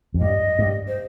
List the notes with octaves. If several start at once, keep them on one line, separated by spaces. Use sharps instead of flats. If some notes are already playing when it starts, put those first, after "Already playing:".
F2
G2 D#5
G2
C5